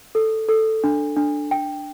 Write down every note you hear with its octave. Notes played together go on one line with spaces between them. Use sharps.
A4
A4
D4
D4
G5